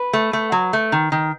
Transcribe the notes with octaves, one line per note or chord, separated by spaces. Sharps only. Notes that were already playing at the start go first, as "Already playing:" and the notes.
Already playing: B4
A3
A3
F#3
A3
D#3
D#3